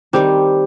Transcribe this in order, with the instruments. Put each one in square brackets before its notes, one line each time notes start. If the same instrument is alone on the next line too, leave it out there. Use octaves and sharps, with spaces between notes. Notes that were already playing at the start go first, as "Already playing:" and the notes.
[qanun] D#3 G3 C4 [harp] G4